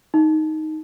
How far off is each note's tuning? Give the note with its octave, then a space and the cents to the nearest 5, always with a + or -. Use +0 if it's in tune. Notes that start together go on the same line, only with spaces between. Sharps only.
D#4 +5